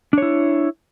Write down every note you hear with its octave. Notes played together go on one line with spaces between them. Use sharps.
D4 E4 C#5